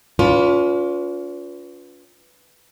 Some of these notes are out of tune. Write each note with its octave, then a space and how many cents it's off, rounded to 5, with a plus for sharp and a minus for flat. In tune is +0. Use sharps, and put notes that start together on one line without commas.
C#4 +45 F4 +20 B4 +0